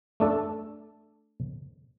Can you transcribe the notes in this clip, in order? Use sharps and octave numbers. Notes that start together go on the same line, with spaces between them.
A3 D4 A4